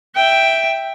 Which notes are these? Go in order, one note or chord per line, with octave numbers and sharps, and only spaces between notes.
E5 G5